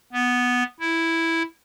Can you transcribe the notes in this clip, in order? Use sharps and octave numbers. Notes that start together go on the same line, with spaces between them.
B3
E4